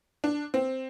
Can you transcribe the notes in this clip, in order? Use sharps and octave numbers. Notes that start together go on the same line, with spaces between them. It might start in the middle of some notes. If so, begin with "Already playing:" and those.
D4
C4